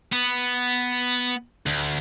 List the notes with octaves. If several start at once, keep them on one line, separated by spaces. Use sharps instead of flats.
B3
D2